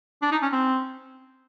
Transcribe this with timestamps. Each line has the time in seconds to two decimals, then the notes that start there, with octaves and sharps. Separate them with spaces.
0.22 D4
0.31 D#4
0.42 C#4
0.52 C4